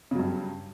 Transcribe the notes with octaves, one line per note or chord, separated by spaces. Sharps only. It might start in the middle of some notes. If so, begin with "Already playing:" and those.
G2 C#3 F#3